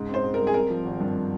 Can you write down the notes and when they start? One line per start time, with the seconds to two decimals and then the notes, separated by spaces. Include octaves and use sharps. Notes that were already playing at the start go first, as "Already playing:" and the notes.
Already playing: G#2 C#3
0.09 C4 C5
0.24 G#2
0.34 A#4
0.39 G3
0.47 G#4
0.54 C4 A#4
0.70 F3
0.85 G#1
1.00 G2